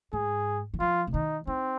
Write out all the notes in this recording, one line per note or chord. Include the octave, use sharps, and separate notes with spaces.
G#2 G#4
D#3
F3 F4
C3
D#3 D#4
C4 D#4